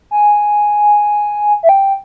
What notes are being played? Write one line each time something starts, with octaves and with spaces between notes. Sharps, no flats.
G#5
E5
G5